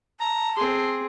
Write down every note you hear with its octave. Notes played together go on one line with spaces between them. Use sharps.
A5 A#5
C4 G#4 C6